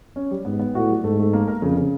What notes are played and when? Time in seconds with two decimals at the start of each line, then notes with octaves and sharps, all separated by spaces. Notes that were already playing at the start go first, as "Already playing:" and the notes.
0.16 C#4
0.31 G3
0.45 G#2 B3
0.59 B3
0.75 A2 F#4
0.89 G3
1.04 G#2 A3
1.19 A3
1.33 A#3
1.48 A#4
1.62 F2 C#3
1.77 C#3